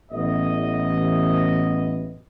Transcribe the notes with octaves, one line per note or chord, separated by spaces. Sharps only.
A1 B3 D#5